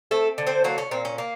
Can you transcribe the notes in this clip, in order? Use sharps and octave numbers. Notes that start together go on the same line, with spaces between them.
A3 C4 A4
D3
C4 C5
F#3 A#3 F#4
C#4
A#2 C4
C#4
A#3